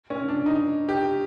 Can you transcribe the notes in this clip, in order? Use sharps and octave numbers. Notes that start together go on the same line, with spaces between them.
C#4
D4
D#4
G4